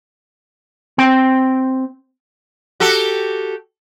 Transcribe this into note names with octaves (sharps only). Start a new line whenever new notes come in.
C4 G5
F#4 G4 A4